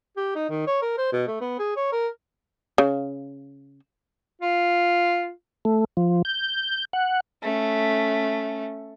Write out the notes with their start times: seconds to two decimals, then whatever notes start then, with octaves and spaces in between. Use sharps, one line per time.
0.17 G4
0.36 D#4
0.49 D#3
0.67 C#5
0.82 A#4
0.98 C5
1.13 B2
1.27 A3
1.41 B3
1.59 G#4
1.76 C#5
1.92 A#4
2.78 C#3
4.41 F4
5.65 A3
5.97 F3
6.25 G6
6.93 F#5
7.43 A3 C#4